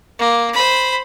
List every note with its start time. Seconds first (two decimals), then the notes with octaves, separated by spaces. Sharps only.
0.19 A#3
0.53 C5 B5